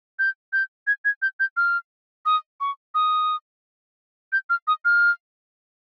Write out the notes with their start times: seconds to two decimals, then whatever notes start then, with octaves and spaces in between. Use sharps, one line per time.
0.19 G6
0.53 G6
0.87 G#6
1.05 G#6
1.22 G6
1.40 G6
1.57 F6
2.26 D#6
2.60 C#6
2.95 D#6
4.33 G6
4.50 F6
4.67 D#6
4.85 F6